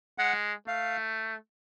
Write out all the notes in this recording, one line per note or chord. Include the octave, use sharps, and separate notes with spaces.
G#3 F#5
A3 F5